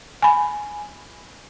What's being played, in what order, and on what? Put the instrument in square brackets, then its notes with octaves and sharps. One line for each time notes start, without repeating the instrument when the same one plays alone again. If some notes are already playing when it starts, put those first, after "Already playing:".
[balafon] G#5 B5